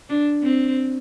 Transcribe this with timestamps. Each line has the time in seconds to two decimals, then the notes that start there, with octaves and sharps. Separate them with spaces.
0.09 D4
0.43 C4